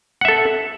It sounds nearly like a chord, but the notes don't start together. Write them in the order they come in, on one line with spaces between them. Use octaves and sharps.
F#5 E5 A4